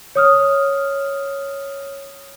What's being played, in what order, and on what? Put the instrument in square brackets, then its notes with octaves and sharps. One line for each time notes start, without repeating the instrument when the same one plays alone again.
[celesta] C#5 D#6 F6